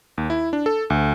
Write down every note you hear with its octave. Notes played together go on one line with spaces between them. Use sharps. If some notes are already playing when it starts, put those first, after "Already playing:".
D#2
E4
D4
A4
D2